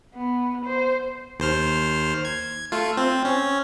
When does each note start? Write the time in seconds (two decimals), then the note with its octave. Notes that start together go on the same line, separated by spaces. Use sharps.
0.15 B3
0.66 C5
1.39 D#2 C5 F6
2.25 G#6
2.72 A3 F4
2.97 C4
3.25 C#4